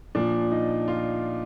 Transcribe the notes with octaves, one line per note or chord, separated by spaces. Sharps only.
A#2 F3 D4
D#4
F4